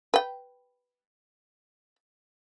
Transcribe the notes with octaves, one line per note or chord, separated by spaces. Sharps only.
B4 G5